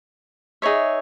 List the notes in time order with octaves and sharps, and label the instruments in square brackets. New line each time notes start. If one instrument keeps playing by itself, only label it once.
[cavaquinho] D#4 G#4 C#5 E5